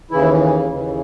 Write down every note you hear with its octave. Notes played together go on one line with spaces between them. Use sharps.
D#2 C#3 E3 E4
D#2 C#3 E3